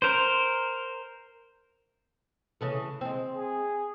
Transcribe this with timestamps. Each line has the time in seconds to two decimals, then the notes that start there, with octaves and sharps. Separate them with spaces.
0.02 A#4 C5
2.61 C#3 E3 A3
3.01 G#3 C4
3.37 G#4